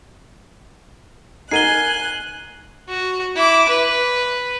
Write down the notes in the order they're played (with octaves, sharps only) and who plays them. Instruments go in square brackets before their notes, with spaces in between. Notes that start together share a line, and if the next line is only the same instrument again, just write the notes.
[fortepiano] D#4 A#4 F#5 [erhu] G#5 [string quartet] F#6 [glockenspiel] C7 D#7 G7
[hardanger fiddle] F#4
E4 D6
B4